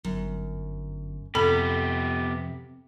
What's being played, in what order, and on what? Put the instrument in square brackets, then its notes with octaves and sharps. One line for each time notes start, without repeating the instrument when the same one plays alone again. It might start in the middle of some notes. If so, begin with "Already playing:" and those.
[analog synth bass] G1 [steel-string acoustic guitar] F#2
[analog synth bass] F2 [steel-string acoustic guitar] C3 [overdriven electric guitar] B3 G4 [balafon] A4 B5